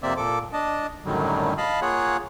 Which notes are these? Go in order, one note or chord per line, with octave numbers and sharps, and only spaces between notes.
F2 C3 A#3 C4 D5 E5
A#2 A4 D6
D4 D#5 A5
F#2 A2 D3 D#3 F#3 G3
D#5 F5 A5 B5
A#3 F4 G#4 C#5 F#5